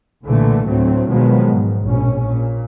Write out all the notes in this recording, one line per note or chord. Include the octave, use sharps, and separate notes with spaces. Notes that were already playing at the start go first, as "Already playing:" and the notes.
B1 A#2 D3 E3 A3
D2 A2 F#3 A3 C4
B2 D#3 F3 F#3 G#3 B3
G#2
A#1 B2 C#4
A#2